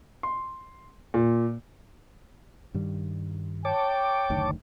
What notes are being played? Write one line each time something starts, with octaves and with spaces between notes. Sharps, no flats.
C6
A#2
G2 D#3 G3
C#5 G5 A5 D6
F#1 D2 D#3